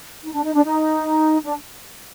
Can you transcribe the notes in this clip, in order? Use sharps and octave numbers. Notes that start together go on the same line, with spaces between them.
D#4
D4
D#4
D4
D#4
D4